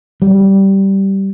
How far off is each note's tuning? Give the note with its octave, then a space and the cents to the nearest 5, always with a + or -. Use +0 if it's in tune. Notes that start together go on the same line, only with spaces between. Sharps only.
G3 -10